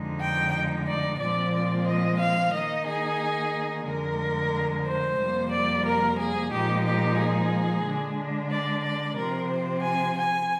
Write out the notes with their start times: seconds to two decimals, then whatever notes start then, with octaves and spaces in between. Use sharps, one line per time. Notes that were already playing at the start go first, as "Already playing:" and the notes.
Already playing: F2 D3 G#3 D#4
0.20 G5
0.86 D5
1.19 A#2 F3 G#3 C4 D5
1.53 D5
1.86 D#5
2.19 F5
2.52 D#3 A#3 D#4 D#5
2.86 G#4
3.85 F2 D3 G#3 A#4
4.85 C5
5.19 F2 C3 G3 A#3
5.51 D5
5.85 A#4
6.18 G#4
6.51 A#2 F3 G#3 D#4 G4
6.85 G4
7.18 G#4
7.84 D3 G#3 D4
8.51 D5
8.83 D5
9.17 C3 F3 C4 A#4
9.50 C5
9.83 G#5
10.17 G#5